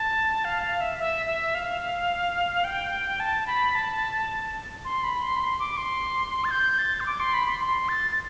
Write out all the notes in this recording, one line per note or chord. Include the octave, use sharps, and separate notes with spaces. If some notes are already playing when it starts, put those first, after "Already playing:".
Already playing: A5
F5
F5
E5
E5
E5
F5
G5
A5
B5
A5
C6
B5
C6
B5
C6
D6
C6
A6
G6
A6
C6
D6
C6
B5
C6
C6
A6
A6